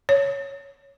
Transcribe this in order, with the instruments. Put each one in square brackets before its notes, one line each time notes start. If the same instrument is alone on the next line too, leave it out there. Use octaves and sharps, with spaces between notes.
[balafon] C#5